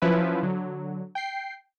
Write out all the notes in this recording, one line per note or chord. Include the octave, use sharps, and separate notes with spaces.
F3 F#3 C#4 E4 B4
D3 F#3
G5 C7